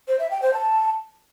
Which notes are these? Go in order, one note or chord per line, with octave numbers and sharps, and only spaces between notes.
C5
E5
G5
C5
A5